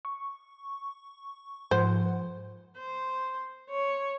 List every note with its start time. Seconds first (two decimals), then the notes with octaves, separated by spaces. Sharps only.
0.05 C#6
1.71 G#2 F3 C5 F#5
2.78 C5
3.70 C#5